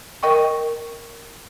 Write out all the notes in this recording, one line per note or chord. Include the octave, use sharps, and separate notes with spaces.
A#4 D#5 G5 C#6